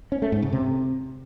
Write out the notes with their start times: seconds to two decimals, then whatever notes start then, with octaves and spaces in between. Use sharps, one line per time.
0.12 C#4
0.22 A3
0.32 G#2
0.42 C#3
0.53 C3